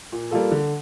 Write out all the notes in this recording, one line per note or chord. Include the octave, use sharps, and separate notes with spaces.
A#2
G3 A#3 F4 A4
D3